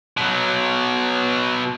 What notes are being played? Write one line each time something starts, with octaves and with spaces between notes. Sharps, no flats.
B2 F#3